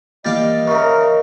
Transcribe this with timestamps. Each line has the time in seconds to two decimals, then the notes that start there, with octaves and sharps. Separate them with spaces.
0.25 E3 G3 A#3 D#5 F5 D6 A6
0.67 C#3 E3 A#4 E5 C#6